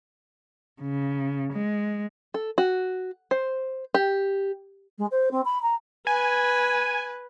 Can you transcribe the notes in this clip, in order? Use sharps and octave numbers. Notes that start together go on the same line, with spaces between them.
C#3
G#3
A4
F#4
C5
G4
G#3
C5
C4
B5
A#5
B4 G#5